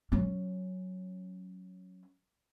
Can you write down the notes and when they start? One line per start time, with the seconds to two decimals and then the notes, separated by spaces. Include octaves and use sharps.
0.12 F#3 C#4